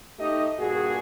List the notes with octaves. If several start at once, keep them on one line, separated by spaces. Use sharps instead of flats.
A3 D#4 G4 D#5
G2 A#2 F#4 G#4